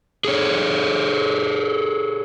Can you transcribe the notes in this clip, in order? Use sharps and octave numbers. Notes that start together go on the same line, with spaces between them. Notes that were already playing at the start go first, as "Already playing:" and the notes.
G#4 A4 C#5